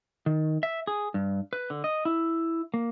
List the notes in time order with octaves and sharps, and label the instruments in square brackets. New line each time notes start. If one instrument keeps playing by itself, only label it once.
[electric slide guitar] D#3
E5
G#4
G2
B4
D3
D#5
E4
A#3